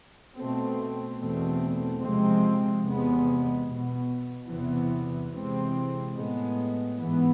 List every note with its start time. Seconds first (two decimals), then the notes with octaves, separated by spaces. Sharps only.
0.36 B2 A3 C4
1.19 E2 B2 A3 C4
2.02 C3 F3 G#3 C4
2.84 E2 C3 G#3 B3
3.67 B2 B3
4.50 E2 C3 E3 B3
5.32 C3 E3 G#3 C4
6.15 A2 G#3 B3
6.97 G#2 E3 B3